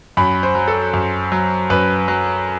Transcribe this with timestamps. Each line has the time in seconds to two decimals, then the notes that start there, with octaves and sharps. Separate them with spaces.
0.17 F#2 B5
0.43 C5
0.55 F#3
0.68 A4
0.94 F#2
1.32 F#3
1.70 F#2 B4
2.08 F#3